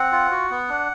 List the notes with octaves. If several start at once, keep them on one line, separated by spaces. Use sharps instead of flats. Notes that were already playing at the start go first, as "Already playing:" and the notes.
Already playing: C4 F#5
F4
F#4
B3
D4